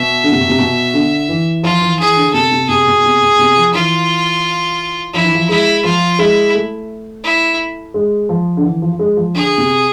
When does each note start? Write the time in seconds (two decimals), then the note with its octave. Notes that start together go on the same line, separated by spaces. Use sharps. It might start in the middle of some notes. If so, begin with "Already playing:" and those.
Already playing: B2 E5
0.24 D3
0.32 C3
0.40 B2
0.49 C3
0.58 B2
0.94 D3
1.29 E3
1.63 F3 F4
1.81 E3
1.99 E3 G#4
2.16 D3
2.33 C3 A4
2.51 C3
2.69 C3 G#4
2.86 B2
3.04 C3
3.22 B2
3.39 C3
3.56 F3
3.74 E3 F4
5.14 F3 E4
5.24 E3
5.35 F3
5.49 G#3 E4
5.84 F3 F4
6.19 G#3 E4
6.54 A3
7.24 E4
7.94 G#3
8.29 F3
8.57 D3
8.64 E3
8.82 F3
8.93 F3
8.99 G#3
9.17 F3
9.35 D3 G#4
9.58 C3